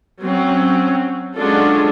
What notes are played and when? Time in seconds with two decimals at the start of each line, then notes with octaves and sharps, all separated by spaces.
0.21 F#3 C4 C#4
1.36 F#3 G#3 C#4 D4 F4 A4